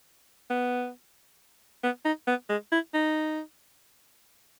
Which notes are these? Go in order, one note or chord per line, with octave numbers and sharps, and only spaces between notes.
B3
B3
D#4
B3
G#3
E4
D#4